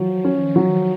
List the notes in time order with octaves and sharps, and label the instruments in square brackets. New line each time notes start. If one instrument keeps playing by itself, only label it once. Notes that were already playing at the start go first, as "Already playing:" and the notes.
Already playing: [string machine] F3 [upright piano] F#3
[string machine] D#3
[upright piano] C#4
[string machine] F3 [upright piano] F#3